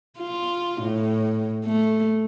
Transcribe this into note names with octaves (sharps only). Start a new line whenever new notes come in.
F4
A2
A3